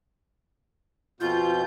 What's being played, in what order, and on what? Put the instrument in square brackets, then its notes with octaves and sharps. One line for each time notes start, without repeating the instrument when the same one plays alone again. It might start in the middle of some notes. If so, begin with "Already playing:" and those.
[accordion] F2 B2 G6 [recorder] F4